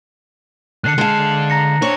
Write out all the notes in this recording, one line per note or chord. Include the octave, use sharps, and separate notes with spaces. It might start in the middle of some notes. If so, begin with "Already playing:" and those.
A2 D3 F#6 C7 C#7
D3 G#3 F5 A5
A#5 A#6 C#7
D4 C5 C#5